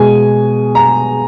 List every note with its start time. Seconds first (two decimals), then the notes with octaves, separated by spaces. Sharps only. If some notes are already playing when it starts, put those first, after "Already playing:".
Already playing: B2 G#3 G#5
0.75 A#5